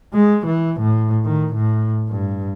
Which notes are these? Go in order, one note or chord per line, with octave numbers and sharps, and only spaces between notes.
G#3
E3
A2
D#3
A2
G2